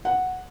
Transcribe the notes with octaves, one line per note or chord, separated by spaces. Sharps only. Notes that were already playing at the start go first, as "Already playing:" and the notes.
F#5